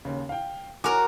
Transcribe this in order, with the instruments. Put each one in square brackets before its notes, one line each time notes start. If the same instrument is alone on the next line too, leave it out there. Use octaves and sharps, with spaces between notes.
[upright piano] D#2 C#3
F5 G5
[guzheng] F#4 A#4 [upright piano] G#5 D6